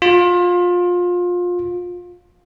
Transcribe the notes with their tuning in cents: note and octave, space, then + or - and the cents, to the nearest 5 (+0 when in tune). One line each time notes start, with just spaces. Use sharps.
F4 +25